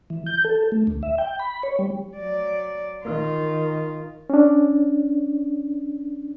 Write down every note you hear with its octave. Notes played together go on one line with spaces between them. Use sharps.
E3
G6
A4
A3
D2
E5
G5
B5
C#5
G3
F#3 D5
D#3 F4
C#4 D4